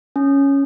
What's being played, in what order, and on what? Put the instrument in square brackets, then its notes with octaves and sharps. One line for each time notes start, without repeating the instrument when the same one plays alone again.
[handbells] C#4